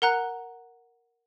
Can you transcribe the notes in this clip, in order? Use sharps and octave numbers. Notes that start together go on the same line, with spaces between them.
A#4 F#5 A#5 F#6